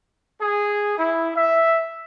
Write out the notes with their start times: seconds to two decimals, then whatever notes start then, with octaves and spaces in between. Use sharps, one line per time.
0.39 G#4
0.96 E4
1.34 E5